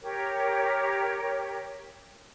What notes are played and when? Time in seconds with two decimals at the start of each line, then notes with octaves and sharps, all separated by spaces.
0.01 G4 A#4 C#5